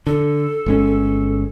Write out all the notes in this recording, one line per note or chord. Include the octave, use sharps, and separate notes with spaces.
D3 A4
G1 G#3 C#4